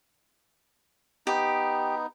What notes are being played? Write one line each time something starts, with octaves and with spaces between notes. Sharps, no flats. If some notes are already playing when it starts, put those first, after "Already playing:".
B3 D#4 G4